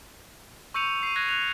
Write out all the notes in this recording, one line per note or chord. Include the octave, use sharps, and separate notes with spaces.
C#6 E6 G6 C#7 D#7 F7
C7 D#7
F#6 G#6 A#6
F#6 F7